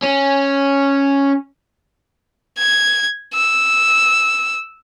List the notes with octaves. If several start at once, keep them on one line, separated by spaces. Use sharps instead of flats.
C#4
G#6
E6